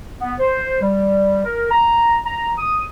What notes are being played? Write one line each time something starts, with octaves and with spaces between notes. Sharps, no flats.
B3
C5
G3
A#4
A#5
A#5
D#6